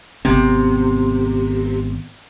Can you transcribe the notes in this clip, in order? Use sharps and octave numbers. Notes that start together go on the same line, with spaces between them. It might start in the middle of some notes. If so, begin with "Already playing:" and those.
G#1 C3 B3 C4